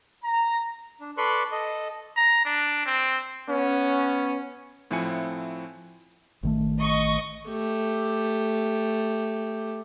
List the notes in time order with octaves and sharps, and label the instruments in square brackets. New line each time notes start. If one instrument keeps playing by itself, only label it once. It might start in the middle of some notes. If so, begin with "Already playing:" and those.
[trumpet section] A#5
[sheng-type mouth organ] D4
A4 B4 D5 C6 C#6 F#6
A4 D#5
[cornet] A#5
D4
C4
[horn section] B3 C#4
[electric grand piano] A2 F3 C4 E4 G#5 C#7
[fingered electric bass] A1 D#3 A3
[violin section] D#5 C#6
[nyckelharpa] A3 G4